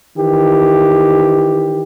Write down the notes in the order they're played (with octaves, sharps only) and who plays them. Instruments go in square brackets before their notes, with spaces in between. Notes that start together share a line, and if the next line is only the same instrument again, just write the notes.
[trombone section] D#3 E3 G4